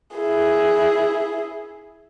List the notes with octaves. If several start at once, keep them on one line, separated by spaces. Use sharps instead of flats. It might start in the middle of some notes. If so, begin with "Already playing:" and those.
E4 G#4